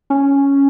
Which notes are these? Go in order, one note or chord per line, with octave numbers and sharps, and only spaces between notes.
C#4